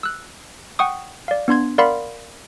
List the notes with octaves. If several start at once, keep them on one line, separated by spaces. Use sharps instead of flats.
E6 F#6
F#5 G5 C#6 D#6
D5 F5
B3 D4 C6 G#6
A#4 D5 F5 F#5 B5 C6